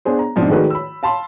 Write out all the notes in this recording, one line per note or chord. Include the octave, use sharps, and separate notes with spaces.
B3 D4 G#4 C5
A#5
G#2 B2 F3 C4 D4
D#3 G#3 A3 F#4 B4 D5
B5 E6
F5 A5 B5 C6